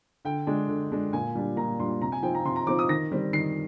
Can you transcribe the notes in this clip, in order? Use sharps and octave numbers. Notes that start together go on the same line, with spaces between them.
D3 G5
G#3 D4
D3
G#3 D4
A#2 G#5
G3 D4
A#2 A#5
G3 D4 C6
C3 A#5
G#5
F3 C4 D#4 G5
A#5
C3 C6
A#5
F3 C4 D#4 D6
D#6
D#3 A#6
G3 C4
D#3 C7